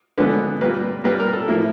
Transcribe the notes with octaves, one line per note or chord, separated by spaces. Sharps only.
D2 D3 F3 G#3 B3 B4
A#2 G3 A#3 B4
A#2 G3 A#3 B4
A#4
A4
A2 F3 A#3 E4